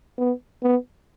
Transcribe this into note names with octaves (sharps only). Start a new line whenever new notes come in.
B3
B3